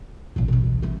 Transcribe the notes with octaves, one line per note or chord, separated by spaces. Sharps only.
A1 A#2 F3
C#2 B2
A3 B3